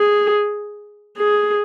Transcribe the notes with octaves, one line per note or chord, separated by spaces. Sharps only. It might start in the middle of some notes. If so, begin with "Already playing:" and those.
Already playing: G#4
G#4